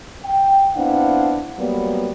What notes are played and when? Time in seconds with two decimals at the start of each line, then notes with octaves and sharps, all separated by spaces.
0.25 G5
0.76 B3 C4 D4 E4 F5 F#5
1.59 F#3 G3 A#3 B3